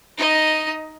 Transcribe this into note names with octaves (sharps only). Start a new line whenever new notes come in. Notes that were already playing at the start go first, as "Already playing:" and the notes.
D#4 D#5